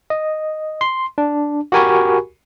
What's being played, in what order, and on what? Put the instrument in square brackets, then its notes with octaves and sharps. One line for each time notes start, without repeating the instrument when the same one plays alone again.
[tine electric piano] D#5
C6
D4
F#4 G4 A#4 G#5 B5 C#6